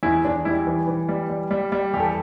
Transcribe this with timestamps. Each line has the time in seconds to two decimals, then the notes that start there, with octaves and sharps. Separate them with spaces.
0.03 E2 E4
0.24 E2 D4
0.45 G3 E4
0.67 E3
0.88 E3
1.09 G3
1.29 G3
1.51 G3
1.72 G3
1.94 E2 G4
2.00 A4